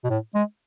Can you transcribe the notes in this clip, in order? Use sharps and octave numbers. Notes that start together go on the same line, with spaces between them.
B2
A2
G#3